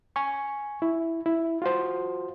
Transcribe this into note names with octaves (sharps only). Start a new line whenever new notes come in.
G#5 C#6
E4
E4
F4 F#4 C5